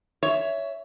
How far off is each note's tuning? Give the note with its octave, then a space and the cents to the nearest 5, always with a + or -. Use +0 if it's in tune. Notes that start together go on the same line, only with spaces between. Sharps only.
C#5 +15 E5 +0